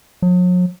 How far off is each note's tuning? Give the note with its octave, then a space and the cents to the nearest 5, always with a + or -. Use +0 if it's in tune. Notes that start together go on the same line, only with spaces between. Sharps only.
F#3 -45